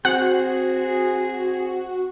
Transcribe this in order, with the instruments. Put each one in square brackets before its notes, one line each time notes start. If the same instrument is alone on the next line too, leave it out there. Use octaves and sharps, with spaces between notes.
[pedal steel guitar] C4 [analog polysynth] F#4 [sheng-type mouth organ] G#4 [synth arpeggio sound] F#5